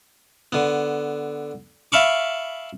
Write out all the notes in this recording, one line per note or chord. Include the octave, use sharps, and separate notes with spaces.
D3 B3
E5 F5 A5 B5 C#6 D6